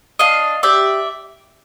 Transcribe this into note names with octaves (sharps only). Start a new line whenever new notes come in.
D4 D#5 F5
G4 D5 E5